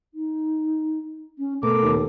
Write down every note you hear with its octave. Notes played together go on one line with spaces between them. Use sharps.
D#4
C#4
B2 A3 A#3 A4 D6
D#2